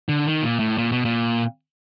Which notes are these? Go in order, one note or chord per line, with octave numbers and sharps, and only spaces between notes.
D3
D#3
A#2
A2
A#2
B2
A#2